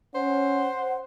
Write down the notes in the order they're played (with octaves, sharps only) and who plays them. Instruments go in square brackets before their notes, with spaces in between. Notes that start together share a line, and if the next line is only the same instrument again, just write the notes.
[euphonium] C#4 [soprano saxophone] C5 [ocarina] F#5